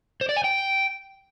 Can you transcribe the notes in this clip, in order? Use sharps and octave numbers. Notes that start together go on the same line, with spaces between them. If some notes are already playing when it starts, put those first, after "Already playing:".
C5
D5
G#5
G5